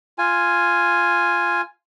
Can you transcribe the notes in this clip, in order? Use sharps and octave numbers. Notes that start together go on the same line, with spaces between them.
F4 G#5